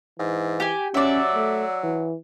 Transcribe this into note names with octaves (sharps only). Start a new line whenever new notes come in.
G#2 E3
G4 G5 G#5
F#3 C#4 D5 E5
A3
E3